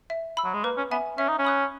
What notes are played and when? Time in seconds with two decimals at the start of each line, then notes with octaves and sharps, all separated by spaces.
0.10 E5
0.37 B5 E6
0.44 F#3
0.54 G#3
0.64 A#3 B4
0.77 C#4
0.91 B3 E5 G#5
1.18 C#4 E5
1.29 D#4
1.39 C#4
1.45 B5 D#6 F#6